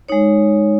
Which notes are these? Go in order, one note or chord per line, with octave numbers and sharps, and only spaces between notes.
G#3 D#4 C#5